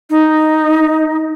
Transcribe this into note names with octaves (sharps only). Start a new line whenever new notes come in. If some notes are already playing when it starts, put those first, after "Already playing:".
D#4